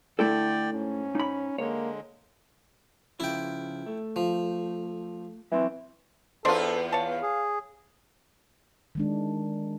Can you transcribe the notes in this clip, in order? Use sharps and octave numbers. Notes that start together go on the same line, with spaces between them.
D3 A3 E4 A4 D5 G5
G#2 C#4
D#4 B5
D3 G#3 A#3 C#5
C#3 F3 E4 F4 G5
A3
F3
E3 F#3 C4 C6
E2 B3 D4 F4 A4 C5
C#5 F5 A5
G#4
D#3 G#3 D4